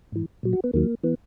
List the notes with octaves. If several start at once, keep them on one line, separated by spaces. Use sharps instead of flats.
G#2 E3
A#2 F#3
F#4
B3
D#2 D#3 F#3 A#3
E3 B3